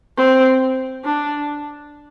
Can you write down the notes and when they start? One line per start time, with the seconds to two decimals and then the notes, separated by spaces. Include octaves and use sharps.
0.18 C4
1.05 D4